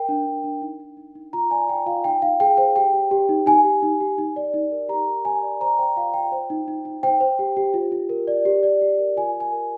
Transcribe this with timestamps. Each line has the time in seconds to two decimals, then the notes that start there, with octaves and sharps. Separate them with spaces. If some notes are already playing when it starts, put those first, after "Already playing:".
Already playing: A#4 G5
0.09 D4
0.26 D4
0.44 D4
0.62 D#4
0.80 D#4
0.97 D#4
1.15 D#4
1.33 F4 A#5
1.51 D5 G#5
1.69 F4 G5
1.86 F4 F5
2.04 D#4 G5
2.22 D#4 F5
2.40 G#4 G5
2.57 C5 G5
2.76 G4 G5
2.93 G4
3.11 G4
3.29 D#4
3.46 D#4 G#5
3.64 G4
3.83 D#4
4.00 G4
4.18 D#4
4.36 D5
4.54 D#4
4.72 A#4
4.89 G4 A#5
5.07 A#4
5.25 G4 G#5
5.43 D5
5.61 C5 A#5
5.78 C5 G5
5.97 F4 F5
6.14 F4 G5
6.32 C5
6.50 D#4
6.68 D#4
6.85 D#4
7.03 C5 G5
7.21 C5
7.39 G4
7.57 G4
7.74 F4
7.92 F4
8.09 A#4
8.27 D5
8.45 G4
8.63 D5
8.82 G4
8.99 A#4
9.17 F4 G#5
9.35 A#4
9.40 G#5
9.52 A#4